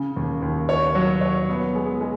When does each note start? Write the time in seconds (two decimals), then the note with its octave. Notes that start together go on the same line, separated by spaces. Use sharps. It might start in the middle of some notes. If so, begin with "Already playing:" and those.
Already playing: C#3
0.17 D#2
0.42 D#2
0.69 C#5
0.95 F#3
1.21 C#5
1.49 B3
1.75 G#3
2.01 G#3